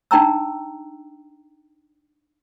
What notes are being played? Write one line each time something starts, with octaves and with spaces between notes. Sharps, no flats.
D4 D#4 G5 A#5 E6